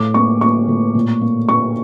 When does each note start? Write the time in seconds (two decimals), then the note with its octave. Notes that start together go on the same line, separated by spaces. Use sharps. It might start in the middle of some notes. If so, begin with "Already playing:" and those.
Already playing: A2 D6
0.14 A#3 C#6
0.41 A#3 C#6
0.68 A2
0.95 A#2
1.21 A#3
1.49 A#3 C#6